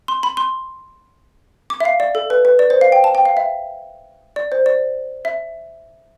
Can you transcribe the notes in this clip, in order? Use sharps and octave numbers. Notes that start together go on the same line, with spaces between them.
C6
B5
C6
D6
E5
F5
D5
A4
B4
B4
D5
C5
F5
G5
A5
G5
F5
E5
D5
C5
D5
E5